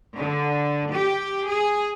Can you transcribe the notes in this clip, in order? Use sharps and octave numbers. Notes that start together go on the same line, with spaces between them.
D3
G4
G#4